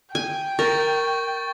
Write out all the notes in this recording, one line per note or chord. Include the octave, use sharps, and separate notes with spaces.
G5 G#5
A#4 C#6 A6